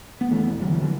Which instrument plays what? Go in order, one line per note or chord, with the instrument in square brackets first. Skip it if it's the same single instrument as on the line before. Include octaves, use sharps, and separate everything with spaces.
[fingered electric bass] B3
E1 E3 A3
D3 F#3
E3
D3 F#3